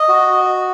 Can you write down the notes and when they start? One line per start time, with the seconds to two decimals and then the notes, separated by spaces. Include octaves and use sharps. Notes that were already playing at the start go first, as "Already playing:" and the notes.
Already playing: D#5
0.09 F#4